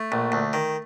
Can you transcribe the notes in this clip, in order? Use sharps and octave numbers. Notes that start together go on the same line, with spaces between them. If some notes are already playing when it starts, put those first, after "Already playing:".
Already playing: A3
A#1
D2
D#3